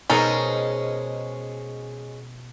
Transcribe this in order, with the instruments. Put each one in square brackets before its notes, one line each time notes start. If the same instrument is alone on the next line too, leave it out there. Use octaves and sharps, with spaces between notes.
[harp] B2 C5 D#7 [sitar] G#3 C#4 [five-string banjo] D#4 A4 A#4